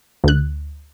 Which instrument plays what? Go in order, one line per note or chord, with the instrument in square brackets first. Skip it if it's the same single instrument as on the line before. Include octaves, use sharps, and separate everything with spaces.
[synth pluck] D2 F#6